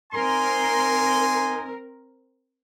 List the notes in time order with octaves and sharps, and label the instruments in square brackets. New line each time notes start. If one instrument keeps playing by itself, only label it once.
[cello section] C4 A#4 [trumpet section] D#4 G#5 C6